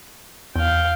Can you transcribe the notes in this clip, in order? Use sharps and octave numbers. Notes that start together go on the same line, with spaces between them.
E2 F5 G5